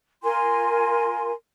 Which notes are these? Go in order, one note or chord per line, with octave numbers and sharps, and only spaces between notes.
F4 A#4 G#5 C6